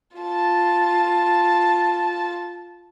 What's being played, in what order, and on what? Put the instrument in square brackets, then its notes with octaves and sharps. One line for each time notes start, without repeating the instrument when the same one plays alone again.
[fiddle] F4 A5